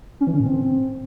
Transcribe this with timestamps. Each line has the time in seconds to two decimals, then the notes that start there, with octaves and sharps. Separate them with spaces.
0.21 C#4
0.27 E3
0.33 D3
0.40 A2
0.46 C4